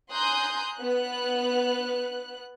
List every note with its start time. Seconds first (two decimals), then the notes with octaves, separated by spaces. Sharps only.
0.12 G#5 A#5 C6 D#6 F#6 G6
0.76 B3 F#6